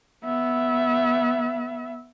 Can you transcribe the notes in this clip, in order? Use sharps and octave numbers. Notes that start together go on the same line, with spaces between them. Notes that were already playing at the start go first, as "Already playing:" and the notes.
B3 E5